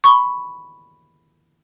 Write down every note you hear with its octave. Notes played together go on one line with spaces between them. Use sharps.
B5 C#6